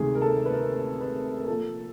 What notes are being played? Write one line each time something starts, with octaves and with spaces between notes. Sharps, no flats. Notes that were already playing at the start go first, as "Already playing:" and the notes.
Already playing: D2 C3 D#3 G#3 G#4
A#4
A4
B4
A#4
B4
A#4
A#2 F3 A#3 A4